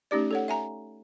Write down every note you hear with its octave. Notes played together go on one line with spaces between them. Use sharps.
A3 C#4 D#4 G4 D5
A4 C#5 F#5
E5 G#5 A#5